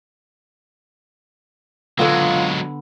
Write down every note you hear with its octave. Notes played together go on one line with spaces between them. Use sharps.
D3 F#3 G#3 B3 F4